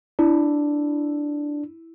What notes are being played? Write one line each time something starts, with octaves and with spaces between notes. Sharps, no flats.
D4 E4